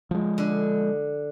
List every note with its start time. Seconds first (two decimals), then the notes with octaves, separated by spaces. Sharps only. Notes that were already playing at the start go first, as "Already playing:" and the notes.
0.11 F3 G#3
0.38 D3